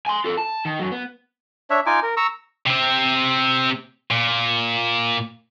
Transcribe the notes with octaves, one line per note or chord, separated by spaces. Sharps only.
G#5 C6
F4 A4
A5
D#3
F#2 F#3
B3
D4 C#5 E5
D#4 F4 G#5 D6
A#4
A#5 C#6 E6
C3 C4
A#2